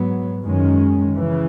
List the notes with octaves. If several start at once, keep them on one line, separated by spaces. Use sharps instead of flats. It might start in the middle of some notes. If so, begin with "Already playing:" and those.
Already playing: G#2 F#3 B3
F#2 D#3 G#3 C#4
C#3 E3